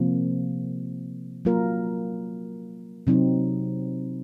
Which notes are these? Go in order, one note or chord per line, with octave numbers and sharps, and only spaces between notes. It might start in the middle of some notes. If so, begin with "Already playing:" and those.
Already playing: C3 F3 A#3
F#3 A#3 F4 A#4
C3 F#3 C4 D#4